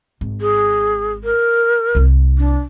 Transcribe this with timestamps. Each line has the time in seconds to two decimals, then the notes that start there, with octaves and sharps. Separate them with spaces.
0.21 G#1
0.41 G#4
1.24 A#4
1.95 C2 E4
2.38 D4